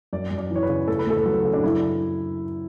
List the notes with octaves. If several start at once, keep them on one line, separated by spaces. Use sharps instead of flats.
F#2 D5
F#2
D5
E3 C#5
B4
C#3
A3 A4
B4
D2 A4
F#3
C#3
D4
F#2 E4